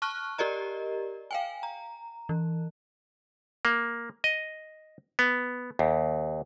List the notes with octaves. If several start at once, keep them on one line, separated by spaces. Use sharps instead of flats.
A5 C#6 F6 F#6
G4 A#4 D5 D#5 A#5
F5 G5 G#5
A#5
E3
A#3
D#5
B3
D#2